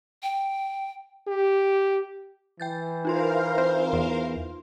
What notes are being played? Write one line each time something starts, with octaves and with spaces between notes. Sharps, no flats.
G5
G4
E3 G5 G6 A6
D#4 F4 A#4 C5 F5 C6
C4
E2